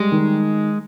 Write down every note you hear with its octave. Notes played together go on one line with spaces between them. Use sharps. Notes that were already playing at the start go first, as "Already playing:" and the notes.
Already playing: G3 G#3
D#3